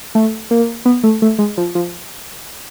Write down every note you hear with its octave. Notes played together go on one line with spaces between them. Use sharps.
A3
A#3
B3
A3
A3
G#3
F3
F3